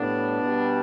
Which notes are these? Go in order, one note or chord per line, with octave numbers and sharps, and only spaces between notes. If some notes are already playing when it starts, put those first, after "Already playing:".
Already playing: A2 G3 B3 D4
B2 G3